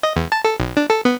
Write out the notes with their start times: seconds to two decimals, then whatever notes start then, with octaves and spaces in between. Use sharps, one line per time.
0.03 D#5
0.16 E2
0.32 A5
0.45 A4
0.60 B1
0.77 D4
0.90 A4
1.05 B3